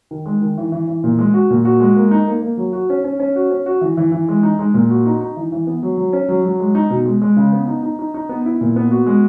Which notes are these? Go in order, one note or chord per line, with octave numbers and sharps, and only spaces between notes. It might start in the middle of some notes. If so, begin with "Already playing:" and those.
D#3
G#3
D#3
E3
E3
E3
A#2
G#3
F#4
A#2
F#4
G#3
A#3
D#4
A#3
A#3
F#3
F#4
C#4
C#4
C#4
F#4
C#4
F#4
E3
E3
E3
G#3
D#4
G#3
A#2
F#4
D#4
D#4
E3
E3
B3
F#3
F#3
C#4
F#3
F#3
G#3
D#4
B2
G#3
G#3
C#3
B3
D#4
D#4
D#4
D#4
B3
E4
A#2
B3
F#4
G#3